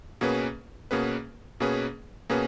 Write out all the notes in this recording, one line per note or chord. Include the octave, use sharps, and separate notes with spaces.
B2 A#3 C#4 G#4 B4
B2 A#3 C#4 G#4 B4
B2 A#3 C#4 G#4 B4
B2 A#3 C#4 G#4 B4